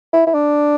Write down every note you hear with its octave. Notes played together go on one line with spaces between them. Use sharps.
E4
E4
D4